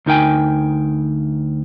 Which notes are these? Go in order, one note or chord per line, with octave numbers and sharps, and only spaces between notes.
D2 D#4 A#4 G5 G#5